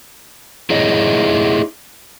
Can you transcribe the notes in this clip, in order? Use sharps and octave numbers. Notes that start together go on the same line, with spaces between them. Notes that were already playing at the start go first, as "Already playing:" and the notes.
D#4 E4 G#4 C#5 D#5